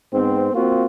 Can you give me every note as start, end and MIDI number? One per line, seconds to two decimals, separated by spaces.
0.13 0.50 44
0.13 0.50 59
0.13 0.50 60
0.54 0.85 58
0.54 0.85 60
0.54 0.85 65
0.54 0.85 66